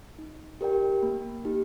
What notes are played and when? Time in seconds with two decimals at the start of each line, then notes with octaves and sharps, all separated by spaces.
0.18 D#4
0.61 G4 A#4 D5 G5
1.03 A#3
1.45 D#4 G4